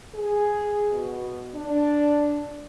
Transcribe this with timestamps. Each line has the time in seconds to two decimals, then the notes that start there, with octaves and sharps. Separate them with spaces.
0.15 G#4
0.91 B2
1.54 D4